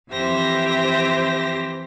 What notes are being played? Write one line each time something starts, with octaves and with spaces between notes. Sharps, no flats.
F2 E3 G4 C5 E5 A#6